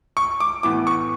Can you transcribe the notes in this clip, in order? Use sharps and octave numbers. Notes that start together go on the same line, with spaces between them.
C#6
D6
A2 E3 B3 D6
C#6